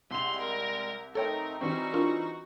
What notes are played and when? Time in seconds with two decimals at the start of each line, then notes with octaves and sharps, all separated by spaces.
0.11 C2 G3 G#3 C6 F7
0.40 A#4
1.15 A3 C4 D#4 A4 A#4 C#5 G5
1.61 E3 G3 C4 D#4 F#4 C#6
1.94 D4 F4 A#4